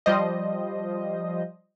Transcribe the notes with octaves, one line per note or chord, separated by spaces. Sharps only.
F3 G3 C5 D#5